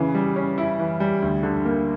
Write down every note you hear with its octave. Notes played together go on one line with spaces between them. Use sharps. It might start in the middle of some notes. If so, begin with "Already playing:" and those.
Already playing: C#3 E3
G3
C#4
E4
E3
G3
D2
D3
A#3